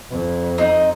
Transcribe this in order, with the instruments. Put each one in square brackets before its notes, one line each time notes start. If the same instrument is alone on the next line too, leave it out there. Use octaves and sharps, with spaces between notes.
[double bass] F2
[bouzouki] C4 D#4 D#5